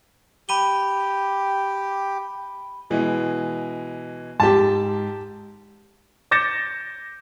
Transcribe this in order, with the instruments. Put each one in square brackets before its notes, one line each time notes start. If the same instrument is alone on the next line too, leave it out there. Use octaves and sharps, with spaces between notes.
[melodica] G4 [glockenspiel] B5 D#7 G7
[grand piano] B2 E3 G#3
[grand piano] G#2 [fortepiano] G4 A5
[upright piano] D6 G6 A6 A#6 C#7 E7